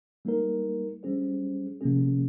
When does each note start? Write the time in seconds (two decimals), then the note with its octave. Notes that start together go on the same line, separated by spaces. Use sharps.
0.25 G3 A#3 D#4 A#4
1.03 G3 C#4 G#4 C5
1.81 C3 F3 A#3 C#4 G#4